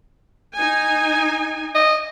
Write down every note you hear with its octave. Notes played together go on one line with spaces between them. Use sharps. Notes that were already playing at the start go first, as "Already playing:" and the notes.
D#4 G#5
D#5